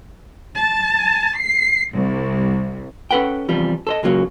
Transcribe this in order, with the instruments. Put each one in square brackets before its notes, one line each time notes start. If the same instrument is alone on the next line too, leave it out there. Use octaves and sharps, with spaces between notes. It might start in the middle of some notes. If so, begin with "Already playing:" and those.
[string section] A5
C7
C2
[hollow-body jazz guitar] C#4 A4 B4 F#5 G5
E2 C3 F3 G3
A4 C5 D#5
C#2 A#2 C#3 F#3 A#3